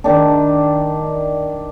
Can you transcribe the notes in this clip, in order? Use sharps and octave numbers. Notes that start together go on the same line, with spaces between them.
D#3 D4